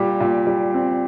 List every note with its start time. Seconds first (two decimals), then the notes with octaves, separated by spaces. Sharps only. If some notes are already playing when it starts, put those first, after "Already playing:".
Already playing: A#2 G3 G4
0.20 A#2
0.47 G3
0.74 C4